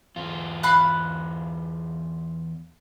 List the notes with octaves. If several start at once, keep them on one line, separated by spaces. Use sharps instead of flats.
E2 F4
F5 B5 F#6